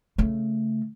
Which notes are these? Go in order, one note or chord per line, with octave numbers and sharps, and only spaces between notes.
C#3 A3